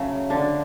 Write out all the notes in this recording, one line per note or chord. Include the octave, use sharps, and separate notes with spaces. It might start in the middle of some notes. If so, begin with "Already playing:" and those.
Already playing: C#3 F#3 A3
D3 D4